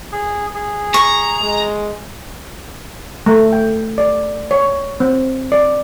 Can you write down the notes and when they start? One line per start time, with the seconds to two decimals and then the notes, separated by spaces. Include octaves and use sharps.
0.12 G#4
0.55 G#4
0.94 A#5 C#6
1.41 G#3
3.26 A3
3.53 G5
3.98 D5
4.51 C#5
5.00 C4
5.52 D5